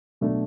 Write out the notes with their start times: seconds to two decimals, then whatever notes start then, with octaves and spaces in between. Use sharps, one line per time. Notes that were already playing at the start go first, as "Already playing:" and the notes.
0.21 B2 F#3 A3 D4